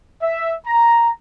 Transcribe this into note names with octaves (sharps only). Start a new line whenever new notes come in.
E5
A#5